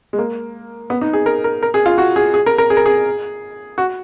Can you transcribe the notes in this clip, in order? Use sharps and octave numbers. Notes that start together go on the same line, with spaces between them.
G#3
A#3
B3
D#4
G#4
A#4
A#4
A#4
G#4
F4
F#4
G#4
G#4
A#4
A#4
G#4
A#4
G#4
F#4